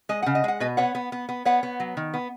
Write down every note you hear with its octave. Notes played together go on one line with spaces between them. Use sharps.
G#3 D#5
C#3 F#5
D#5
G#3 F#5
B2 B4 D#5
B3 C#5 F#5
B3
B3
B3
B3 C#5 F#5
B3
F#3
D#3
B3